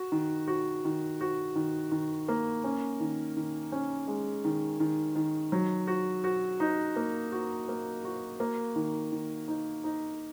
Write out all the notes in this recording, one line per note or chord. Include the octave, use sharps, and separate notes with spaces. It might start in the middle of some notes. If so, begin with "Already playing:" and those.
Already playing: F#4
D#3
F#4
D#3
F#4
D#3
D#3
A#3
C#4
D#3
D#3
C#4
G#3
D#3
D#3
D#3
F#3
F#4
F#4
D#4
A#3
F#4
A#3
F#4
A#3
D#3
D#3
D#4
D#4